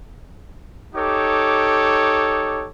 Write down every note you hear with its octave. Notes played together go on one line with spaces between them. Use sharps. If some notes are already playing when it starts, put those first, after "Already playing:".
D#4 G4 A4 C#5 D6